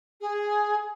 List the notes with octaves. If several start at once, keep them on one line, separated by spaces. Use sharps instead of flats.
G#4